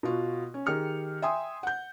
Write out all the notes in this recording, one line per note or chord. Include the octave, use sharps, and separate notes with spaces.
B2 F4 F#4
C#4
D#3 G4 G#4 F6 C#7
E5 G5 G#5 C6 D#6
F#5 G6